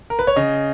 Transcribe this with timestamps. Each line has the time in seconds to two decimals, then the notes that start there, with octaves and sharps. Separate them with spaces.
0.10 A#4
0.19 B4
0.27 C#5
0.36 C#3 D#5